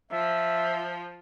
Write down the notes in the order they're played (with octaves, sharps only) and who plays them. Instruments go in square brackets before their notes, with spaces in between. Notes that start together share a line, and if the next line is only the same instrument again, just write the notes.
[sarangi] F3 [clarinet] E5